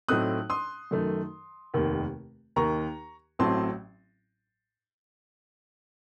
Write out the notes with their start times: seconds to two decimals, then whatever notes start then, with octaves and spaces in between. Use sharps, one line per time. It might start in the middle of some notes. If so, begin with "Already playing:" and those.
0.08 A2 F#3 A3 C4 D#4 D#6 F#6
0.50 C6 D#6
0.91 F#2 D#3 A3
1.74 F1 D#2 D#3 A#3
2.56 D#2 D#3 A#3 A#5 C#6
3.39 A1 A2 F#3 C4 A5 C6